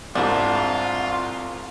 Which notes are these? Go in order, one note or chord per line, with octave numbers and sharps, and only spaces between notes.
C2 G#2 D4 E4 F4